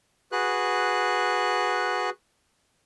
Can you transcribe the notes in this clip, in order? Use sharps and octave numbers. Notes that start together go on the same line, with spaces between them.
F#4 G#4 B4 F#6